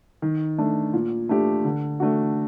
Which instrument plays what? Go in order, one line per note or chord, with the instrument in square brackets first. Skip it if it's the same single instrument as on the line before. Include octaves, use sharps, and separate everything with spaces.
[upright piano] D#3
A3 D4
A#2
A3 D4 G4
D3
A3 D4 F#4